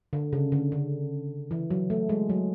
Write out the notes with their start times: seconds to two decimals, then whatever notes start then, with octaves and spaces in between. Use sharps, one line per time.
0.13 D3
0.33 C#3
0.52 D3
0.72 D3
1.51 E3
1.70 F#3
1.90 A3
2.09 G#3
2.30 F#3